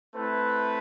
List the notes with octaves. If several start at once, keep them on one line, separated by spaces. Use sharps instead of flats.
A3 C4 E4 B4